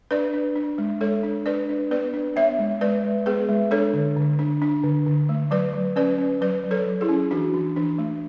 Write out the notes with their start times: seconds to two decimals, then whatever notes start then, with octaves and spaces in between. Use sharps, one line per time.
0.11 D4 B4 D5
0.33 D4
0.56 D4
0.78 G#3
1.01 G#3 A4 C#5
1.23 D4
1.46 D4 B4 D5
1.69 D4
1.91 B3 B4 D5
2.13 D4
2.36 B3 C#5 E5
2.59 G#3
2.81 G#3 B4 D5
3.04 G#3
3.26 B3 G#4 B4
3.49 G#3
3.71 D4 A4 C#5
3.93 D3
4.17 D3
4.39 D4
4.62 D4
4.84 D3
5.06 D3
5.29 A3
5.51 F#3 B4 D5
5.74 F#3
5.96 C#4 B4 D5
6.18 C#4
6.41 F#3 B4 D5
6.64 F#3
6.71 A4 C#5
6.87 F#3
7.01 E4 G#4
7.09 C#4
7.31 E3 D4 F#4
7.54 E3
7.76 E3 D4
7.98 A3